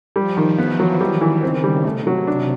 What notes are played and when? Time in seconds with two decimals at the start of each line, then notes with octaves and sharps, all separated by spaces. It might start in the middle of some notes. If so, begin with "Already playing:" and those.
0.16 F3 G3
0.37 D#3
0.58 E3 B3
0.79 F#3
1.00 D#3 G3
1.21 E3
1.42 C#3 C4
1.64 G3
1.85 C3 A3
2.07 F#3
2.27 D4